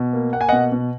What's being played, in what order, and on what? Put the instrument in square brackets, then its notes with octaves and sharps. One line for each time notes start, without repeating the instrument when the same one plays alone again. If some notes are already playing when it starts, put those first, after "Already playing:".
Already playing: [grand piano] B2
A#3
A#3 F#5
G#5
B2 D#5 F#5
B2